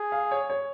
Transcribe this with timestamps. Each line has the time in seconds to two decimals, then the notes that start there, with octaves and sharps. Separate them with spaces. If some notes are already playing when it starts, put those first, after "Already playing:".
Already playing: G#4
0.12 F5
0.31 C#5
0.50 C#5